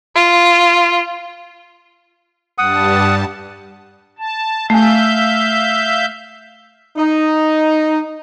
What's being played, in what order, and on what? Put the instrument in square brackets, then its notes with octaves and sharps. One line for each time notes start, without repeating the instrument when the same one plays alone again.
[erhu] F4
[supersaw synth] G2 G3 A5 [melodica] F#5 D#6
[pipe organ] A5
[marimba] A3 G#5 [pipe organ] E5 F5 G6
[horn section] D#4